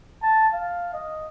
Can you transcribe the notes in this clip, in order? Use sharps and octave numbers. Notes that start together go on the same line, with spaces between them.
A5
F5
D#5